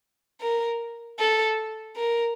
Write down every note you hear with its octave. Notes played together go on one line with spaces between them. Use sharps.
A#4
A4
A#4